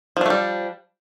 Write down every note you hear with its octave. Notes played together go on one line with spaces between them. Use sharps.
F3 G3 A3 D4